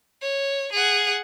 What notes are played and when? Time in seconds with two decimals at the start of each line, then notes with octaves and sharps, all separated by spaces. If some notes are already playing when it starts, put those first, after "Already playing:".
0.22 C#5
0.73 G#4 F#5